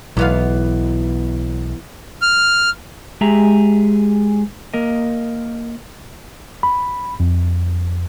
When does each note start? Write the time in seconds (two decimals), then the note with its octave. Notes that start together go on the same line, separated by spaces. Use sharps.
0.17 B1 E3 B3 F5
2.22 F6
3.21 G#3 G4 G#4 E5 A#5
4.74 A#3 A#4 D#5
6.63 B5
7.20 F2